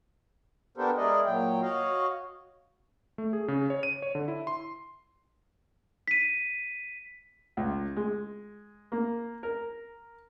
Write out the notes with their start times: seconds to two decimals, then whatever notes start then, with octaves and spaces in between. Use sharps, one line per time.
0.77 B3 D4 G4 A4 A#4 C5
0.98 G#3 E4 G#4 A#4 D5 D#5
1.25 A#2 F#3 G5
1.62 F#4 C#5 D#5 F5
3.18 A3
3.33 G#4
3.48 C#3
3.70 C#5
3.83 D#7
4.02 C#5
4.15 D3
4.28 E4
4.47 C6
6.08 B6 D#7
7.57 C#2
7.97 G#3
8.92 A#3
9.43 A#4